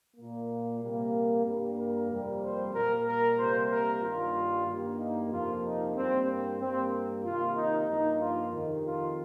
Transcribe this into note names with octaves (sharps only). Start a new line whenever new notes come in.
A#2 A#3
C3 G3 A#3
G2 G3 A#3
A#4
F2 C3 G3 A#3
C5
A#2 G3 A#3 A#4
A#4
C3 G3 A#3 C5
A#4
G2 D#3 G3 A#3 F4
G2 G3 A#3
D#4
F2 C3 F3 A#3 F4
D#4
G2 G3 A#3 C4
C4
G2 G3 A#3 C4
C3 D#3 A#3 F4
D#4
G2 F3 A#3 D#4
F4
F2 C3 D#3
F4